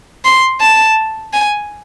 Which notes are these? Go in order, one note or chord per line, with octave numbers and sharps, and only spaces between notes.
C6
A5
G#5